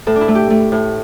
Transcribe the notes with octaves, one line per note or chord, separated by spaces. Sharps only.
A2 A4
D4
E4
A3
G4
A3
A2